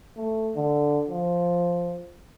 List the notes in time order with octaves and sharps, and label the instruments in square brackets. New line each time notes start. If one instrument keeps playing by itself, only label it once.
[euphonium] A3
D3
F3